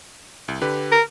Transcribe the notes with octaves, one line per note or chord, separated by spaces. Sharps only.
C2
D3 G4 B4
A#4